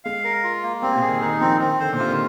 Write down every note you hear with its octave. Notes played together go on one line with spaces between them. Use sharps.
G#3 F5
A#4
F4
A#3
G3 C4
C3
A#2
G#4
D#3
D#3 D#4
F3 C4
D#3 C4
D3 C5
A#2
C3 F4
D#3